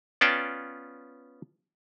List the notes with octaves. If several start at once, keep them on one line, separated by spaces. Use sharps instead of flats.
B3 C#4 F4 D5 G5 A5